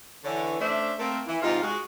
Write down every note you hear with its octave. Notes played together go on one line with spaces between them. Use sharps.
D3 E3 C#5
A3 C#4 D4 C5 D5 E5
A3 A#3 C4 A4 A#4
E3
G#2 C3 D#4 F4
G#3 F#4 G#4